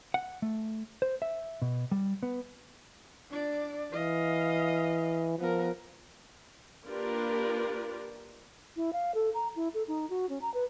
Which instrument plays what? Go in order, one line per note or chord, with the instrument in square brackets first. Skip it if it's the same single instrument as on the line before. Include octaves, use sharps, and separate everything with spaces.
[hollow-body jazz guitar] F#5
A3
C5
E5
B2
G3
B3
[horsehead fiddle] D4 D5
[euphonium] E3 [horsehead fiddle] D#5 F5
[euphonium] F3 [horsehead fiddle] B3 A#4
[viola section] A#3 D4 F4 G4 A#4 B4
[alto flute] E4
F5
A4
A#5
E4
A4
D#4
F#4
C#4
A#5
B4